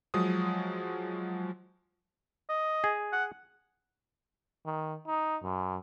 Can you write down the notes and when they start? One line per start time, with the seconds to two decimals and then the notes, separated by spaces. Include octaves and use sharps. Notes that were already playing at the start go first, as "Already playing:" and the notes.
0.14 F3 F#3 G#3 D#6
2.49 D#5
2.84 G#4
3.13 F#5
4.66 D#3
5.07 D#4
5.42 F#2